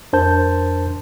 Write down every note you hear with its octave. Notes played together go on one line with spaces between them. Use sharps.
F2 D4 A#4 C5 A5 G6